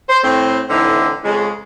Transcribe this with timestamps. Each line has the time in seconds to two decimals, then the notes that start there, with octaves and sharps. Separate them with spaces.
0.09 C5
0.24 A2 C4
0.70 A2 D3 E3 C4 D#4
1.24 F2 C#3 G#3